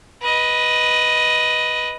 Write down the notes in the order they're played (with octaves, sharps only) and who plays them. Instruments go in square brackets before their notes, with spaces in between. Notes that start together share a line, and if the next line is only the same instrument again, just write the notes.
[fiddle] B4 D#5